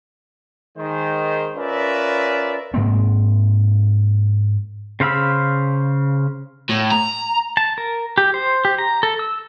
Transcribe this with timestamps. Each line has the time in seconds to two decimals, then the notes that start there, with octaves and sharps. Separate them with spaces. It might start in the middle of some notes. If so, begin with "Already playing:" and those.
0.77 D#3 G#3 C5
1.56 C#4 F4 A#4 B4 D5 E5
2.74 G#2 G#3 A#3 C4
5.00 C#3 C5 F5 B5 E6
6.70 A2
6.92 A#5
7.57 A5
7.78 A#4
8.18 G4
8.34 C5
8.65 G4
8.78 A#5
9.03 A4
9.19 E6